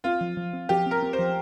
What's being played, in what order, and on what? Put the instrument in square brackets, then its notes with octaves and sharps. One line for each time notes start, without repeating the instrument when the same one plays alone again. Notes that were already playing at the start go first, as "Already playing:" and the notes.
[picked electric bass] C4 [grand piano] F4
[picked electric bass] F3
F3
C4
[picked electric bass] F3 [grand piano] G4
[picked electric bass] C4 [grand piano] A#4
[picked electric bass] C4
[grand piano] C5
[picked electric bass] F3